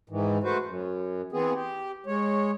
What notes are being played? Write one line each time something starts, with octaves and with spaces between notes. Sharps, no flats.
G#2 D#3 E3
A3 F#4 B4 C5
F#2
E3 B3 C4 G#4
G4
G#3 C#5